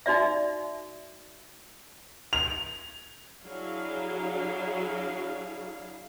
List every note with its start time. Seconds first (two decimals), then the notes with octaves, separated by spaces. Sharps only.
0.06 D#4 F#4 D5 E5
2.33 F7
3.44 F#3 D4 E4 G#4 F5